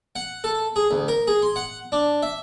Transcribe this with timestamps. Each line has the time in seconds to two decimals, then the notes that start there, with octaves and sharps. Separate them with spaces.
0.16 F#5
0.44 A4
0.76 G#4
0.91 D2
1.08 A#4
1.27 G#4
1.42 C6
1.56 F#5
1.92 D4
2.23 E5